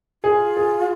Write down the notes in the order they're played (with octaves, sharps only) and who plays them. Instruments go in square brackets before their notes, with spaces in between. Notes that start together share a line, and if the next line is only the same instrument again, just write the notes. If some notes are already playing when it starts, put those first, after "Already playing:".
[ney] F4 [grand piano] G#4
[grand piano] G#4